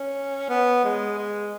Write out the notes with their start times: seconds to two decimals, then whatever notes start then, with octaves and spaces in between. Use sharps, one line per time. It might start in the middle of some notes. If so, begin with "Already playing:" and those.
Already playing: C#4
0.50 B3
0.84 G#3
1.18 G#3